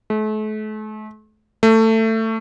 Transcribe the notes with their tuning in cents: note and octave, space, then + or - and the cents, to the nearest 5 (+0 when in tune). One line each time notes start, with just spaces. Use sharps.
A3 -40
A3 +20